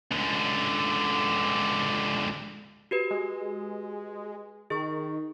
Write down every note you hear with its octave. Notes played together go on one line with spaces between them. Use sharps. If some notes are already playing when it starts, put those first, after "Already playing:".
C#2 D3
F#4 G4 B4
G#3
D#3 G#4 C#6